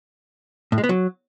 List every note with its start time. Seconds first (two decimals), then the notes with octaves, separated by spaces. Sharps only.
0.72 A2
0.78 G#3
0.84 B3
0.89 F#3